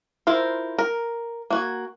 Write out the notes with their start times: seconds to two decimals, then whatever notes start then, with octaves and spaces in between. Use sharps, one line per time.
0.27 E4 F4 A#4 C5
0.79 A#4
1.50 A#3 F#4 G#5